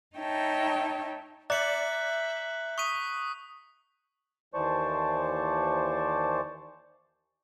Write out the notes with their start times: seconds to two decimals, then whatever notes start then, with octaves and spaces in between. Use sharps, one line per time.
0.17 D#4 C#5 E5 G5 A5
1.50 D5 E5 A#5 F#6 G6 C#7 F#7
2.78 C#6 D#6 B6 D#7
4.54 D#2 E3 C5 D5 A5 C#6